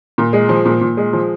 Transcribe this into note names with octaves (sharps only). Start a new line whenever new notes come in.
A#2
G#3
F3
A#2
A#2
G#3
F3